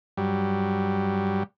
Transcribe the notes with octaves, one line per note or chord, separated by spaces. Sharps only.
G2 F#3 G3